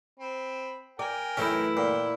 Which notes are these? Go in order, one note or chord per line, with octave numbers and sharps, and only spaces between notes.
C4 B5
A#4 D5 G5 G#5
F#2 E3 A3 C#4 D#4 E4
A#2 G5